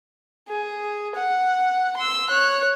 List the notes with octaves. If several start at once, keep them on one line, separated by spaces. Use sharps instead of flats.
G#4
F#5
C6 E6
C#5 F#6